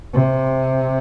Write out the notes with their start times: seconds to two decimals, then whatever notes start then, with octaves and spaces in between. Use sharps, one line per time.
0.13 C3